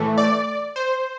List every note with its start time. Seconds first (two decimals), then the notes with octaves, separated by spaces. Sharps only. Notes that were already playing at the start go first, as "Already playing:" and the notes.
Already playing: A2 E3 A3
0.18 D5
0.76 C5